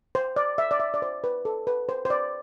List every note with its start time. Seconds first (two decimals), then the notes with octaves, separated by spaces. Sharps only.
0.15 C5
0.36 D5
0.58 E5
0.71 D5
0.80 E5
0.94 D5
1.02 C5
1.24 B4
1.45 A4
1.67 B4
1.89 C5
2.05 C5
2.10 D5